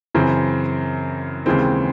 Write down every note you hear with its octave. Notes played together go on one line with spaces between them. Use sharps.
F#2 C#3 E3 C4
D#2 C#3 E3 G#3 C4